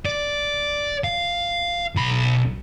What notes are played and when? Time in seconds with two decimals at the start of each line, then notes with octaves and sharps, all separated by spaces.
0.05 D5
1.04 F5
1.95 B1 B5